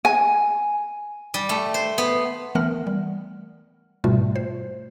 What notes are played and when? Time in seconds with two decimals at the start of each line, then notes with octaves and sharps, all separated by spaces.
0.05 G#5
1.34 G3
1.49 A3
1.74 C5
1.98 B3
2.55 E3 A3 B3 A#4 F#5 F6
2.87 G3
4.04 G#2 B2 G3 A3 F4
4.36 C5